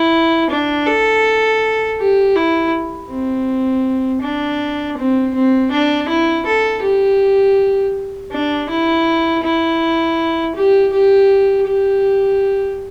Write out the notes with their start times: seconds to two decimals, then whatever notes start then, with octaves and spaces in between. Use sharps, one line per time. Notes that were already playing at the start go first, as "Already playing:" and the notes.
Already playing: E4
0.50 D4
0.87 A4
2.00 G4
2.36 E4
3.11 C4
4.23 D4
4.97 C4
5.34 C4
5.72 D4
6.09 E4
6.46 A4
6.83 G4
8.32 D4
8.70 E4
9.43 E4
10.55 G4
10.93 G4
11.67 G4